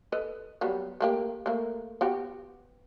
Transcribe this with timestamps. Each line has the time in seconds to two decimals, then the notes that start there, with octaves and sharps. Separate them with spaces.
0.12 A4 B4 D#5
0.61 F#3 G3 B3
1.01 A3 A#3 G4
1.46 A3 A#3
2.01 B3 F#4 G4